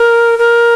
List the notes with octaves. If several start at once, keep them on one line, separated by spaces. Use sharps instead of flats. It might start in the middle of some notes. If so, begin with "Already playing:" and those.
Already playing: A#4
A#4